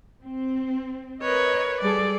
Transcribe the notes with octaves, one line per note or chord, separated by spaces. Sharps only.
C4
A#4 B4 C#5 D#5
G3 G#4 A4 D5